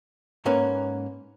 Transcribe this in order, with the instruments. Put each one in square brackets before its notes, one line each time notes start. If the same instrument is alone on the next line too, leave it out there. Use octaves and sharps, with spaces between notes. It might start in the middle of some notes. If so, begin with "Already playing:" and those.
[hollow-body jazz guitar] G#2 A#3 C#4 B4